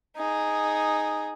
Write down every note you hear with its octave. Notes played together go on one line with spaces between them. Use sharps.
D#4 G#4